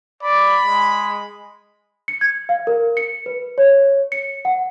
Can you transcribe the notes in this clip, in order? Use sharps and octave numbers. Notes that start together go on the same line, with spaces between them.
D5 B5
G#3
C#7
G#6
F5
A#4
C#7
B4
C#5
C#7
F#5